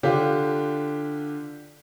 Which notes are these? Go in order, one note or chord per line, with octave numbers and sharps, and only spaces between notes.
D3 D4 F4 G4